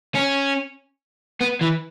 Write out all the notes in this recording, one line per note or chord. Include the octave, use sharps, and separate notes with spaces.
C#4
B3
E3